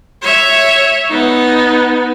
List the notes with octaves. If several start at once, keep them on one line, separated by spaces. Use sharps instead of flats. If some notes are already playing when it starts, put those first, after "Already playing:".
C#5 E5
B3 D#4